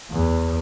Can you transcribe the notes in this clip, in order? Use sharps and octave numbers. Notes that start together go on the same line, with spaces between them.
E2